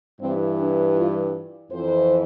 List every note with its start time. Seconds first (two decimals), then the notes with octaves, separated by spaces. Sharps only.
0.21 G2 E3 C4
0.59 D4
0.96 F4
1.71 F2 E3 C5